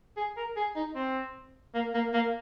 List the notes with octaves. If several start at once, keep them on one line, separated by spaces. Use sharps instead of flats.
G#4
A#4
G#4
D#4
C4
A#3
A#3
A#3